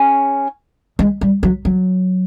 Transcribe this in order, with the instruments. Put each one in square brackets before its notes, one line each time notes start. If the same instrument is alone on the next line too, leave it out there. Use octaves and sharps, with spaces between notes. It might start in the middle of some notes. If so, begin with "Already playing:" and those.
Already playing: [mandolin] C#4 G#4
[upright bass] G#3
G3
F#3
F#3